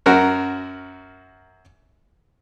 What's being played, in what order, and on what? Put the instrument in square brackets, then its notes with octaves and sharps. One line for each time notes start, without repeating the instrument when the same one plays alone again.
[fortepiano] F#2 F#4 A#4